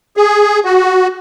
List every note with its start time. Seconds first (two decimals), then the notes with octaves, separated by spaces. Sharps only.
0.17 G#4
0.65 F#4